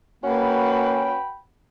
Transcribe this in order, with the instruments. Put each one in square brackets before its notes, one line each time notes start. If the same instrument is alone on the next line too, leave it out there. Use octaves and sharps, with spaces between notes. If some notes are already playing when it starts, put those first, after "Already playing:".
[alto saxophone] A#3 [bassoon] C#4 [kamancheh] F#4 B4 [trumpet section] G5 B5